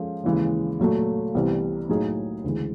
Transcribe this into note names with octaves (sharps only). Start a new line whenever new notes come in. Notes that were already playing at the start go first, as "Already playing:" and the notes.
Already playing: F3 G#3 C#4 A4
D#2 C#3 E3 G#3
A#2 F#3 A3
C2 C3 E3 G3 B3
A2 F#3 A#3 D#4 G#4
D2 C#3 E3 G#3